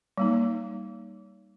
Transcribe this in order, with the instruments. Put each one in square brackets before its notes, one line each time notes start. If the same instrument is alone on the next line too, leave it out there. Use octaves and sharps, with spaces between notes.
[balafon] G3 A#3 D#4